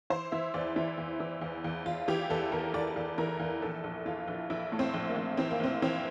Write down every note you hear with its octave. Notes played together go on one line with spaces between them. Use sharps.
E3 C5
E3 E5
E2 D5
E3 E4
E2
E3
E2
E2
E2 F4
E3 G4
E2 A4
E2 A#4
E2 D5
E2
E3 A#4
E2
A#1 A4
A#1
E3 F4
A#1
A#1 E4
A2
C4
A#1
A#3
A#1
E3 C4
A#3
A#1 C4
E3 C4